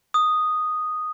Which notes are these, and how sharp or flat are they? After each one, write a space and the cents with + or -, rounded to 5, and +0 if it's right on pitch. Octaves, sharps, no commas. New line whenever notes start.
D#6 -5